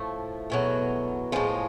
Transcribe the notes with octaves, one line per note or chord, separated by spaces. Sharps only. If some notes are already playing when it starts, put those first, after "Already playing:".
Already playing: A2 F3 A3
E2 B2 F#3
A2 F3 G#3